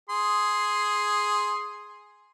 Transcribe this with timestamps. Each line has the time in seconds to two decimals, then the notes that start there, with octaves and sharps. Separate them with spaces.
0.09 G#4 C6